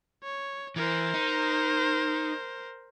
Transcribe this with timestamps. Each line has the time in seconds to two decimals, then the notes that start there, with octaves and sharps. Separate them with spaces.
0.23 C#5
0.76 E3 A#4 C5
1.14 D#4